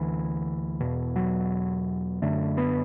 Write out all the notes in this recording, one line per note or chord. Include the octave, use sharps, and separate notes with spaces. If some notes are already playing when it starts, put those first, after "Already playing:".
Already playing: D2 D3 E3
E2 B2
F#3
F#2 D3 A3
B3